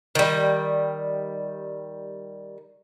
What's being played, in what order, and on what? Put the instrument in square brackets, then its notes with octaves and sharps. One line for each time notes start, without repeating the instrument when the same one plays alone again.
[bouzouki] D#3 G3